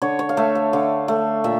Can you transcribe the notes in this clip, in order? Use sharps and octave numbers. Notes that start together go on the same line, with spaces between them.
D3 C#5
C#5
F5
A3 E5
F5
D3 F5
A3
A#2 E5